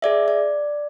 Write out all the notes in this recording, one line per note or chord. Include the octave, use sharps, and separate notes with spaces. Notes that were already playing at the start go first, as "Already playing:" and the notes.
G#4 D5 E5
D5